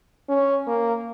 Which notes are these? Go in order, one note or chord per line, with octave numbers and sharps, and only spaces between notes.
C#4
A#3